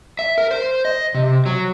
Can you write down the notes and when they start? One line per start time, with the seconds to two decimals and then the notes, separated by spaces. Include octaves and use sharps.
0.19 E5
0.38 A#4
0.51 C5
0.85 D#5
1.14 C3
1.46 F#3